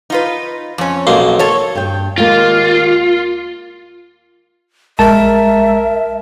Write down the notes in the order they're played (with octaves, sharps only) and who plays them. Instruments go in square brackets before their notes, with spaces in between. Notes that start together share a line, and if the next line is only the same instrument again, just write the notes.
[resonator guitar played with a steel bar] D#4 F4 B4
F2 C#4
[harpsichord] B1 A#3 C6
[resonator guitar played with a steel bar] A4 C#5
[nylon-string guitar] G2 G5
[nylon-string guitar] D#2 G#3 A#3 [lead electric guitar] F4
[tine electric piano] A#1 G#3 A6 [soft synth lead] A#4 [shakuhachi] E5 [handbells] A5